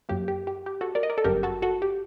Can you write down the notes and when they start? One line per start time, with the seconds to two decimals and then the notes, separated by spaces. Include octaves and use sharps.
0.09 F#2 F#3 A#3 G4
0.28 G4
0.47 G4
0.66 G4
0.81 F#4 A4
0.95 A#4 D5
1.03 D#5
1.10 A#4 D5
1.18 A4
1.24 G1 F#2 F#3 G4 A#4
1.43 F#4 A4
1.62 F#4 A4
1.82 G4